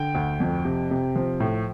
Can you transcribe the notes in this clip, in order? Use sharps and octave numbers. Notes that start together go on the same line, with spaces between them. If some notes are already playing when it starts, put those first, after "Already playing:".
Already playing: D3 G5
D2
F2
C3
C3
F3
A2